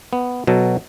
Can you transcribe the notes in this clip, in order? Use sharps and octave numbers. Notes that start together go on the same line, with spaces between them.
B3
B2 F#3 A4